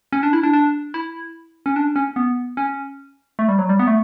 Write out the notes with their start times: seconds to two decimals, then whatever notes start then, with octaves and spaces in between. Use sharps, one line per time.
0.13 C#4
0.23 D4
0.33 E4
0.43 D4
0.53 D4
0.94 E4
1.66 C#4
1.76 D4
1.96 C#4
2.16 B3
2.57 C#4
3.39 A3
3.49 G3
3.59 F#3
3.69 G3
3.79 B3
3.87 A3